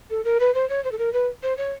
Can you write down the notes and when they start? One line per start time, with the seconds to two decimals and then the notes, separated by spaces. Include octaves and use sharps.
0.10 A4
0.25 A#4
0.40 B4
0.54 C5
0.69 C#5
0.84 C5
0.92 A4
0.99 A#4
1.13 B4
1.43 C5
1.58 C#5